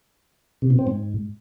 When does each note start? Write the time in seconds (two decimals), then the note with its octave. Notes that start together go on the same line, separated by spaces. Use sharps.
0.62 C3
0.70 B2
0.79 C4
0.87 G#2